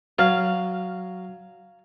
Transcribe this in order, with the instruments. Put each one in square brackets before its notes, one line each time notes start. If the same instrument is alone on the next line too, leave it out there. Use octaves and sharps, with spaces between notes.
[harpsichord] F#3 [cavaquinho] F5